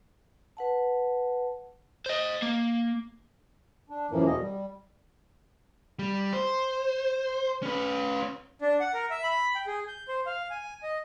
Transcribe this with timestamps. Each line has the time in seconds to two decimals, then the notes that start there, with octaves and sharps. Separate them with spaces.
0.57 B4 F#5 A5
2.06 C5 D#5
2.43 A#3
3.90 D4
4.11 F#2 A2 E3 F3 A#3
4.26 E2 B2 D#5
4.40 G3
5.99 G3
6.33 C5
7.63 C#4 B4
8.62 D4
8.80 F#5
8.94 A#4
9.10 E5
9.23 B5
9.55 G5
9.67 G#4
9.88 G6
10.08 C5
10.26 F5
10.50 G#5
10.83 D#5